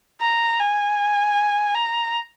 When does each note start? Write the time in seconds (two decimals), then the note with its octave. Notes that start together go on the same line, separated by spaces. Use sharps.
0.21 A#5
0.60 G#5
1.74 A#5